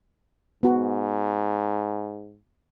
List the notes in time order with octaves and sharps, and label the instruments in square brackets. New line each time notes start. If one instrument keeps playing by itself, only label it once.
[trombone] G#2 [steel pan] B3 F#4